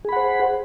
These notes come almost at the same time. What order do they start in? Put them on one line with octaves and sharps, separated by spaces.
G#4 B5 F#5 C5